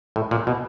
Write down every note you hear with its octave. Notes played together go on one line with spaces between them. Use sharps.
A2
A#2
B2